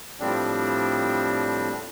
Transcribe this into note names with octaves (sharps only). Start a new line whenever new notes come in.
A2 F3 G3 C4 D4